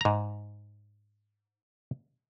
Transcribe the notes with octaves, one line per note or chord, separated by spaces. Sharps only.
G#2 A#5